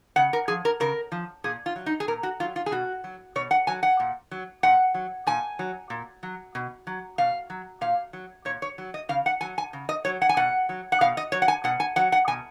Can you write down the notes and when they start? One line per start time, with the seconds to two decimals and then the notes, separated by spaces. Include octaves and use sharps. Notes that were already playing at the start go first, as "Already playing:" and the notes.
0.16 C#3 F#5
0.33 A#4
0.48 F3 G#4
0.65 A#4
0.80 C#3 A#4
1.12 F3
1.44 A#2 G#4
1.66 F4
1.76 F#3
1.86 D#4
2.00 G#4
2.08 A#2 A#4
2.23 F#4
2.40 F#3 F4
2.56 F4
2.66 G#4
2.71 B2 F#4
3.04 F#3
3.36 B2 C#5
3.51 F#5
3.67 F#3 G#5
3.83 F#5
4.00 A#2
4.31 F#3
4.63 A#2 F#5
4.94 F#3
5.27 A#2 G#5
5.59 F#3
5.90 A#2
6.23 F#3
6.55 B2
6.87 F#3
7.18 B2 F5
7.50 F#3
7.81 A#2 F5
8.13 F#3
8.45 A#2 C#5
8.62 C#5
8.78 F#3
8.94 D#5
9.09 C#3 F5
9.26 F#5
9.41 F#3 G#5
9.58 G#5
9.73 C#3
9.89 D#5
10.05 F#3 C#5
10.22 F#5
10.29 G#5
10.37 B2 F#5
10.69 F#3
10.92 F#5
11.01 B2 F5
11.17 D#5
11.32 F#3 C#5
11.42 F#5
11.48 G#5
11.64 B2 F#5
11.80 G#5
11.96 F#3 F#5
12.12 F#5
12.28 B2 G#5